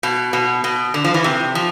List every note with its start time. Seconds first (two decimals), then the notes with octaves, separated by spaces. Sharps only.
0.03 B2
0.33 B2
0.64 B2
0.94 D3
1.04 F3
1.14 E3
1.24 C3
1.55 F3